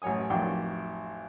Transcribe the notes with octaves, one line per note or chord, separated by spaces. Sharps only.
A1 F#2 C#5 G#5 D#6
A1 F2 D#3 F#3 D5 G5